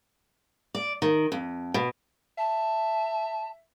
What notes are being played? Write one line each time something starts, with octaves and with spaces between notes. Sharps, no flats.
D5
D#3
F2
B2
E5 A5